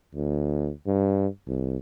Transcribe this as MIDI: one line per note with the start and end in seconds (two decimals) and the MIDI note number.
0.14 0.71 38
0.86 1.27 43
1.47 1.77 36